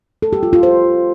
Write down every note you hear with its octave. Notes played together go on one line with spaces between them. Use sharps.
A4
G4
F4
F4
C5